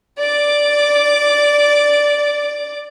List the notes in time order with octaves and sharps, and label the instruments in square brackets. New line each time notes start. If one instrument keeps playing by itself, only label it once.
[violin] D5 D6